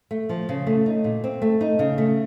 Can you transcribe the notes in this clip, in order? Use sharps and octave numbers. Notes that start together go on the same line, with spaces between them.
A3
F3
C#3
A3
D#4
A#2
C4
A3
D#4
C#3
A3